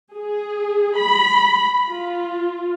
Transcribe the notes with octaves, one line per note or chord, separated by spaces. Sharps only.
G#4
B5
F4